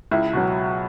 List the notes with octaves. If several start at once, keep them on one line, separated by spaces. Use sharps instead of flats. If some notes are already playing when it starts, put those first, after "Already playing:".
C#2 E4
B2 F#3